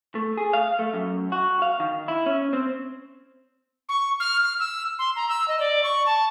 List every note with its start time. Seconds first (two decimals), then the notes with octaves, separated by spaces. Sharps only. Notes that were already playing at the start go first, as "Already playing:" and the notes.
0.15 A3
0.37 G#4
0.53 F5
0.79 A3
0.94 F#2
1.32 F#4
1.62 F5
1.80 D#3
2.08 E4
2.26 C#4
2.53 C4
3.89 C#6
4.20 F6
4.43 F6
4.60 E6
4.99 C6
5.16 A#5
5.29 E6
5.48 D#5
5.60 D5
5.84 C#6
6.06 A5